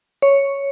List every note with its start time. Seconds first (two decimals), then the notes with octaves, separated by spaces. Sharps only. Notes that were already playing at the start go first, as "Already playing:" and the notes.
0.22 C#5